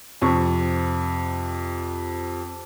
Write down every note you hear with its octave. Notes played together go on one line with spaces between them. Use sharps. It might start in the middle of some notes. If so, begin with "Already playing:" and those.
F2 C3 C#6